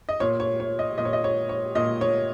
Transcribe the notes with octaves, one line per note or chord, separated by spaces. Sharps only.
D#5
A#2 C#5
C#5
C#5
D#5
A#2 D#5
C#5
D#5
C#5
C#5
A#2 D#5
C#5